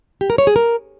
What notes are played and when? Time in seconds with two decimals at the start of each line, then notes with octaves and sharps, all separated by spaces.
0.21 G4
0.30 A#4
0.38 C#5
0.47 G#4
0.56 A#4